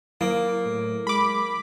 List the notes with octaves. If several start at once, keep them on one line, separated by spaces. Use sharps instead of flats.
F#3 A#3 E4 D7
A2
G#3 B5 D6